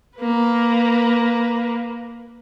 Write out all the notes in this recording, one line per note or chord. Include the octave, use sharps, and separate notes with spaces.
A#3 B4